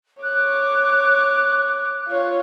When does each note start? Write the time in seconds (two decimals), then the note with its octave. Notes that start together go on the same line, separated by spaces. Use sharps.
0.23 C#5 D6 F#6
2.08 F4 C#5